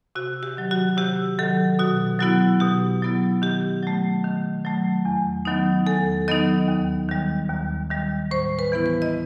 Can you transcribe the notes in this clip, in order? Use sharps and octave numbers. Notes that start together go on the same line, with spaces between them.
C3 F#4
G4
D#3 F#3
F#4
C3 G4
D#3 F#3 A4
B2 F#4
F#3 B3 E4 F#4
B2 G4
F#3 B3 E4
D#3 G4
F#3 A3
D#3
F#3 A3
E2
D#3 F#3 B3 D#4
E2 A4
D#3 F#3 B3 D#4 D#5
D#2
D#3 G3
D#2
D#3 G3
A2 C5
B4
E3 B3 E4
B4
D#5